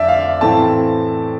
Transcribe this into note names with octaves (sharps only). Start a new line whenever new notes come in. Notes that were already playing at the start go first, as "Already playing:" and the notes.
Already playing: F2 D3 D5 E5
F5
A2 E3 A3 C4 A5